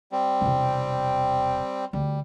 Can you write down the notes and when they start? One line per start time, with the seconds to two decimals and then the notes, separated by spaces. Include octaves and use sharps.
0.12 G3 C4
0.41 E1 C3
1.93 D2 G3